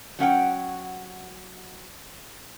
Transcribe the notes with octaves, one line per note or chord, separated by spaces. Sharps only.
F#3 C#4 F#5 G5